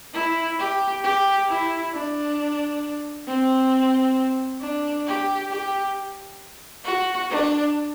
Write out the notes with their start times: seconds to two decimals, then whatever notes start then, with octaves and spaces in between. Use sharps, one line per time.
0.14 E4
0.59 G4
1.04 G4
1.48 E4
1.93 D4
3.28 C4
4.61 D4
5.07 G4
5.51 G4
6.85 F#4
7.30 D4